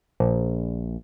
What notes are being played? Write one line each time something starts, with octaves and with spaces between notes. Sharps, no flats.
A#1